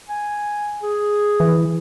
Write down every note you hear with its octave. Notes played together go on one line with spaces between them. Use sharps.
G#5
G#4
E3